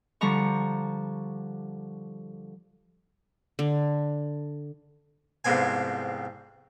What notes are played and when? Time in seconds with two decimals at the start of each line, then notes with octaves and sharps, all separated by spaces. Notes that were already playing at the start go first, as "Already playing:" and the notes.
0.21 D3 F3 G3 A#5 C#6
3.59 D3
5.44 C2 F2 G#2 B3 C4 G#5